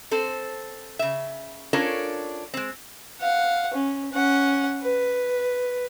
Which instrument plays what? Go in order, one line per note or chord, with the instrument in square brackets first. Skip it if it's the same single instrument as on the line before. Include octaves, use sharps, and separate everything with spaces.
[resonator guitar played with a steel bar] C4 A4 C5
C#3 E5
C#4 D4 F4 A4 A#4 C#5
G#3 C4
[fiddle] F5 F#5
C#4
C#4 F#5
B4